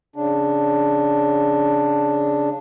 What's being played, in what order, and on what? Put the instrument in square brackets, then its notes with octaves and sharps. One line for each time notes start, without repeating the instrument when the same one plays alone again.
[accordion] C#3 D4